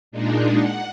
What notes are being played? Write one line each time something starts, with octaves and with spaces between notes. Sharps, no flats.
A#2 G#3 D4 D#4
F#5